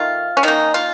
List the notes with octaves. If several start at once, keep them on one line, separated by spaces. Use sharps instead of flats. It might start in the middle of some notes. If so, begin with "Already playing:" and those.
Already playing: D#3 A3 F4
C#4
D#3 A#3 D#4
F4